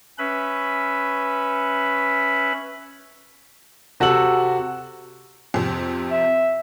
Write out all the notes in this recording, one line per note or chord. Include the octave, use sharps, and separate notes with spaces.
C#4 B4 E5 B5
C3 F#4 A4 E6 F#7
F2 C3
E5